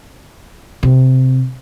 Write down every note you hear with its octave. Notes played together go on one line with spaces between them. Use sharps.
C3